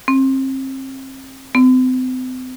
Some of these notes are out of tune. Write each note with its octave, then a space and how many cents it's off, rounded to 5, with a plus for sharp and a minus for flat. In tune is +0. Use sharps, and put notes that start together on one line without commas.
C4 +35
C4 -40